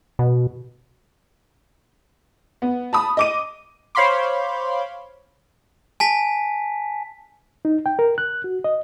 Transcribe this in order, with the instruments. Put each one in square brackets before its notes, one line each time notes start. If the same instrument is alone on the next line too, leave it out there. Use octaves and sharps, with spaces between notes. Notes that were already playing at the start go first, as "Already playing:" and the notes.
[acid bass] B2
[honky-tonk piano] B3
A5 B5 D#6
D#5 D6 D#7
[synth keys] C5 C#5 F5 B5 C6 D6
[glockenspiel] G#5 A5 B6
[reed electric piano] D#4
G5
A#4
F#6
F#4
D#5